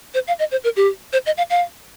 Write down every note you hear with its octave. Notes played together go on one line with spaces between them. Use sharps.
C5
F5
D#5
C5
A#4
G4
C5
D#5
F5
F5